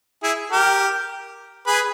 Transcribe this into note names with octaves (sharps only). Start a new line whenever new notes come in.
E4 G#4
G4 A#4
G#4 B4